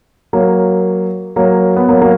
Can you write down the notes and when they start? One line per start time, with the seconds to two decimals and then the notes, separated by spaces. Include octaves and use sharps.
0.33 F#3 A#3
1.36 F#3 A#3
1.77 B3
1.89 F#3 A#3
2.01 F#3 A#3